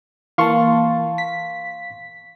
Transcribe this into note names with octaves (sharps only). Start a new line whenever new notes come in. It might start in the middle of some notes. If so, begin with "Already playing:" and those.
E3 A#3 F5 A5 C6 C#6
B6